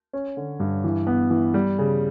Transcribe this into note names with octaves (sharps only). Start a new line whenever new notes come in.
C#4
D3
G2
E3
B3
E3
G3
C#3